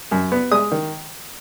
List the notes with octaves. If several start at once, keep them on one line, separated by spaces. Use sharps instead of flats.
F#2
B3
G#3 D#6
D#3